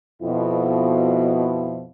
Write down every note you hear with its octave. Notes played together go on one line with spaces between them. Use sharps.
F2 B2 E4